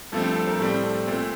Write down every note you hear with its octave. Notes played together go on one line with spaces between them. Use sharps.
G2 F3 A3 C4 A4
A4
A4
A#4
A2 G3 C4 A4
A4
A#2 A3 C4